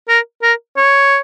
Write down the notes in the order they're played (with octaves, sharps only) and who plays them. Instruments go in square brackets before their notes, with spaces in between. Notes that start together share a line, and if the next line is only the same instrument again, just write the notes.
[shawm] A#4
A#4
C#5